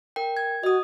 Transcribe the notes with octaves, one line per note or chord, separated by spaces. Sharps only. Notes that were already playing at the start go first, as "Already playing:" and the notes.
A#4 G5
G#6
F#4 D#5 D#6